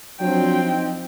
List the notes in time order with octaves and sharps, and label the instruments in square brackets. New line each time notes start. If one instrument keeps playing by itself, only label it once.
[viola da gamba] F3 C4 [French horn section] F#3 D4 [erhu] G5
[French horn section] D#4